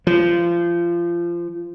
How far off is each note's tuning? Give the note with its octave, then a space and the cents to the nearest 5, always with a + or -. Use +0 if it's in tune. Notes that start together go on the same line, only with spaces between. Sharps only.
F3 -25